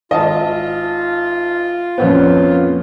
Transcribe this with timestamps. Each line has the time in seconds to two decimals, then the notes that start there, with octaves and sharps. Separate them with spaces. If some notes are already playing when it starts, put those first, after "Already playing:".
0.11 G#1 F4 D#5 E5 A5
1.98 F2 A#2 B3 C#4 C5